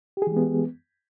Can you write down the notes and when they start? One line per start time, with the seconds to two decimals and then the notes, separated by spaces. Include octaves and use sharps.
0.17 G4
0.22 G#4
0.27 E3
0.32 G#3
0.37 B3